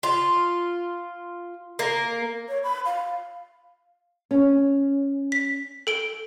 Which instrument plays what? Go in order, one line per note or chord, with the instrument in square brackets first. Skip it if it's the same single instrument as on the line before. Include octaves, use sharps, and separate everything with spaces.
[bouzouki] F4
A#3
[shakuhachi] C#5
B5
F5
[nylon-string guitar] C#4
[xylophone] B6
A4 D7 G7